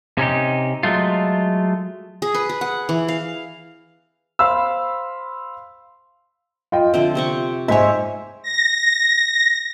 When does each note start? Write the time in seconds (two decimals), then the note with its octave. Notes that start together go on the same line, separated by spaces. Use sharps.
0.18 C3 C#4 D#4 G4
0.83 F#3 G#3 A3 F4
2.22 G#4
2.34 B4
2.49 G#4
2.61 F#5
2.89 E3
3.08 F5
4.39 C5 F5 B5 C6 E6
6.72 F4 D#5 G5
6.94 D3 F3 C4 E5
7.15 C3 C4 C#6
7.68 G#2 C5 C#5 E5 G#5
8.42 A#6